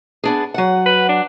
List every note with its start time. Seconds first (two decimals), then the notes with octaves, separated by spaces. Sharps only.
0.24 B3 D4 G#4
0.54 F#3 F#5
0.86 B4
1.08 D4